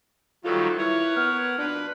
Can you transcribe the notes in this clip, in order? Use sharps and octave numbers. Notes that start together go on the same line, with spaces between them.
D#3 F#3 G3 A3 C4 F4 A4
E4 A#4 B4 C#5
B3 F6
B2 F3 A#3 D4 B4